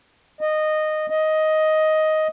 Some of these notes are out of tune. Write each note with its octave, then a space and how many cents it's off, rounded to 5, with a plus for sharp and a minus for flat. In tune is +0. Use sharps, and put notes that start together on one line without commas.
D#5 -15
D#5 +5